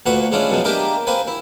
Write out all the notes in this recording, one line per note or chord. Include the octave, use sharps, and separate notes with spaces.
D2 A#2 F#4 B4 F#5 C#6
G#3 C#4 D4 E4 F4
F#2 B2 F3 G#3
A#3 D4 G4 A#4 D#5 E5
A#3 C4 B4 G#5
E4